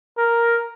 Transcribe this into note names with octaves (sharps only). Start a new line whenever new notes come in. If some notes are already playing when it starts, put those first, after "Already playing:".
A#4